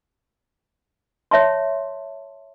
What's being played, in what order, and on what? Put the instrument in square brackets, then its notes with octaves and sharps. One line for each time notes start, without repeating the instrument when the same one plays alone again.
[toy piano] C#5 E5 A5 C6